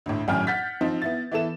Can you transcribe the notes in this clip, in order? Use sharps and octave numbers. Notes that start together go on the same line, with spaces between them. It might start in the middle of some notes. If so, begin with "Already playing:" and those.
D2 A2
G#1 F#2 A2 G5 G#5 F6
F#5 G6 A6 B6
F3 C4 D#4
B3 E4 A6
E3 B3 E4 A4 E7